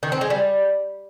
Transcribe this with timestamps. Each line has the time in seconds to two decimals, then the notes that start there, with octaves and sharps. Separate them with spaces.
0.03 D#3
0.12 C4
0.21 G#3
0.30 G3